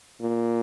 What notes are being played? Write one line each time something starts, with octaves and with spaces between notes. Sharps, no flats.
A#2